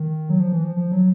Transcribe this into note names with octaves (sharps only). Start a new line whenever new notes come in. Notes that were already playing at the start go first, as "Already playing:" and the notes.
Already playing: D#3
F#3
F3
E3
F3
F3
F#3